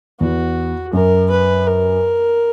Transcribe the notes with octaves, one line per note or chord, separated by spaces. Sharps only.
E2 F#4
F#2 A#4
B4
A#4